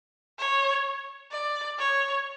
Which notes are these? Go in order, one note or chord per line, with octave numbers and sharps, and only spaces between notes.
C#5
D5
C#5